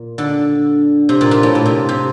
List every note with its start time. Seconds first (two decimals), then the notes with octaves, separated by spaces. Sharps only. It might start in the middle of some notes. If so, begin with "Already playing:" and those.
Already playing: A#2
0.18 D3
1.09 C3
1.21 A#2
1.31 A#2
1.43 A2
1.55 A#2
1.66 C3
1.89 C3